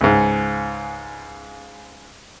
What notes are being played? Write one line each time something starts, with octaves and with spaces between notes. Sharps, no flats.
C#2 G#2